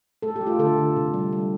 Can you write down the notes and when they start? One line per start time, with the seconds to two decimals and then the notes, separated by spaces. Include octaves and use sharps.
0.22 A3 A4
0.36 G4
0.41 A3
0.47 F4
0.59 D3 A4
0.78 D3
0.96 C3
1.14 G3
1.33 G3